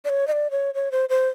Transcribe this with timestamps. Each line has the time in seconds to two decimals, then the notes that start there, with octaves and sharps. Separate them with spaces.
0.05 D5
0.09 C#5
0.27 D#5
0.32 D5
0.51 C#5
0.74 C#5
0.92 C5
1.09 C5